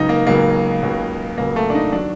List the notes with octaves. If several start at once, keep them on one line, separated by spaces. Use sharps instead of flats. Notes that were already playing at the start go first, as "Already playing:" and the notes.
Already playing: C#2 C#3 F#3 D#4
A#3
C#2 C#3 F#3 A#3
C#2 C#3 F#3
C#2 C#3 F#3 A#3
A3
D4
D#4
D#3 F#3 D4